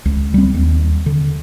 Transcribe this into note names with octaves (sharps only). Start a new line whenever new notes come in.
C#2
G3 C4
D#2
D3